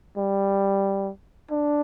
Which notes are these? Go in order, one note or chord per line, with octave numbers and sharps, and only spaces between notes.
G3
D4